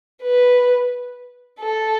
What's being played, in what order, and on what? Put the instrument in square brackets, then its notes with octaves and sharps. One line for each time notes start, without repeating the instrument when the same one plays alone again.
[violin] B4
A4